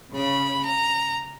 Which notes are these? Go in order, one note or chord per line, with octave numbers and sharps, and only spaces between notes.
C#3 B5
A#5